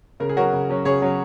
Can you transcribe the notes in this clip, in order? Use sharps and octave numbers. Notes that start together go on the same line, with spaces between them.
C#3 A#4
G#4
F#3 C#4 F#4 A#4
C#3
F#3 C#4
C#3 G#4 C#5
F#3 C#4